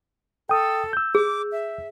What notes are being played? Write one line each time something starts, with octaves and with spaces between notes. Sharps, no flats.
A4 G5 D#6
E6 G6
G#4 D6
E5